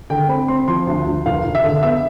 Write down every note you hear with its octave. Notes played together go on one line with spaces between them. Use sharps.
D3 G5
C4 B5
C4 C6
F3 C6
D2
D2
F1 F5
F1
E5
D3
B3 E5